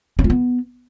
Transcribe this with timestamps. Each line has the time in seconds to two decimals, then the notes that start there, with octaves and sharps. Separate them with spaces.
0.19 C#4
0.24 F4
0.30 B3